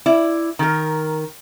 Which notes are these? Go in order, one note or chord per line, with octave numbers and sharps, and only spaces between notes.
E4 D5
D#3 A#4